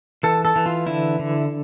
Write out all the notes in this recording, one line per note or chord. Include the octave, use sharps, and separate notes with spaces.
E3 A4
A4
E3
F4
D3 E4
D3